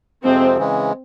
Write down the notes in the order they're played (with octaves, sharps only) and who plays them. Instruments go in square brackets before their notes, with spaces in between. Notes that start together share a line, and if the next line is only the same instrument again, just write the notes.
[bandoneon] F2 C3 F3 G#3 [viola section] C4
[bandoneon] C#3 E3 G#3